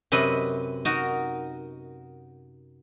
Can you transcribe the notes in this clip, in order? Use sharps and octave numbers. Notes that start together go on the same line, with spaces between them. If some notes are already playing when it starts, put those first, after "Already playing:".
F#2 C3 B4 D#5
D#4 F#4 A#4 D#5